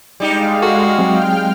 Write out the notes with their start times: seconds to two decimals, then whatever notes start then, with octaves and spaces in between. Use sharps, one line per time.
0.20 G3 G#3 D#4 G4 F5
0.63 F#4 A4
0.99 F#3 G#3 C4 G5 F6